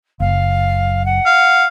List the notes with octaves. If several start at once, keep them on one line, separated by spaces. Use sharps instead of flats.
F#1 F5
F#5
F5